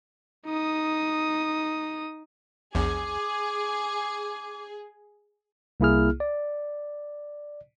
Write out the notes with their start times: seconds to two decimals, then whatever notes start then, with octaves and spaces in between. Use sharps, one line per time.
0.47 D#4 D#6
2.75 A#1 E2 G#4 D6
5.80 C2 A#3 E4 G#4 F6
6.20 D5